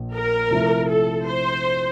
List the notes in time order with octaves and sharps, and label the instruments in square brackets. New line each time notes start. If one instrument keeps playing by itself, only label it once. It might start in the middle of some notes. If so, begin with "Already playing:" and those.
Already playing: [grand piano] A#1 A#2 F3
[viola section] A#4
[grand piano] C3 F3 A3 E4
[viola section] A4
C5